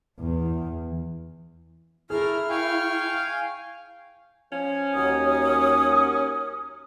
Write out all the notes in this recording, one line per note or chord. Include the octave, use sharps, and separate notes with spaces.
E2
A3 E4 G#4 A#4 F6
F5 G5 G#5 C#6 F6
F3 C#4
D#2 F#3 D#6